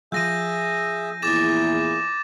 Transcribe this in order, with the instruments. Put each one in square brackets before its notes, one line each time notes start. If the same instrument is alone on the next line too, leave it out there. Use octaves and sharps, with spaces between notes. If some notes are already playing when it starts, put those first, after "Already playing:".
[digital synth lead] F3 [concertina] G#4 E5 [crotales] G6 A#6 D#7
[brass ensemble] E2 A#2 E4 [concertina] G#4 [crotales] D6 A6 E7